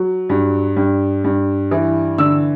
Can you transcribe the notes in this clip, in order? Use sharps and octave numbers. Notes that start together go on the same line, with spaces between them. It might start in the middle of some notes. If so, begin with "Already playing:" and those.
Already playing: F#3
G2
G2
G2
E3
D3 E6